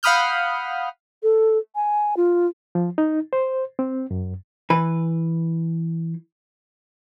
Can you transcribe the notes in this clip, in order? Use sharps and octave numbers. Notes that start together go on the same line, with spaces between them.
F5 F#5 B5 D#6 F6 G6
A4
G#5
F4
F3
D#4
C5
C4
F#2
E3 B4